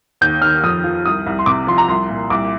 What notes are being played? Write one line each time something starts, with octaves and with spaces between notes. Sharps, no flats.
D#2 G6
D#3 F6
F2 D#6
F3
C2 D#6
C2
C6
C3 D6
F3 C6
A#5
C2 C6
A#2
C2 D6